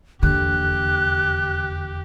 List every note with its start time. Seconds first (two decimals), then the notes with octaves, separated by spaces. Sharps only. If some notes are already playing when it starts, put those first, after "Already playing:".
0.23 F1 E2 D3 A#3 G4 F#6